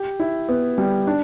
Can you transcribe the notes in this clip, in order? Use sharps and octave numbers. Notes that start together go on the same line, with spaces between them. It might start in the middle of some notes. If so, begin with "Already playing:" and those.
Already playing: G4
E4
B3
G3
D4